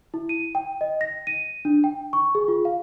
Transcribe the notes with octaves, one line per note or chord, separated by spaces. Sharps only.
E4
D#7
G5
D#5
A#6
D#7
D4
G5
C#6
G#4
F4
F5